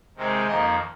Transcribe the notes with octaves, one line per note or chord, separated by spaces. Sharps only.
C3 D#3 G#3 C4
F2 D#3 A#3 D#5